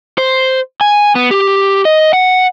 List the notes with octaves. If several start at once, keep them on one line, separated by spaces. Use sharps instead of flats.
C5
G#5
B3
G4
D#5
F#5